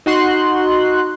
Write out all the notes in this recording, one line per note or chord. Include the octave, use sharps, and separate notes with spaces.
D#4 F#4 C6 F#6